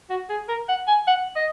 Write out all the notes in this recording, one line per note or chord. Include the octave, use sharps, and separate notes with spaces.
F#4
G#4
A#4
F#5
G#5
F#5
D#5